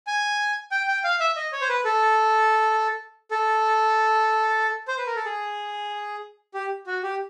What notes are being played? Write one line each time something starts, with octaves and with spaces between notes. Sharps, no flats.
G#5
G5
G5
F5
E5
D#5
C#5
C5
B4
A4
A4
C5
B4
A#4
A4
G#4
G4
F#4
G4